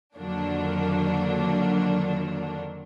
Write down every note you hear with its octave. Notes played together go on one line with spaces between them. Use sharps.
F2 D3 D#3 F#3 A#3 D4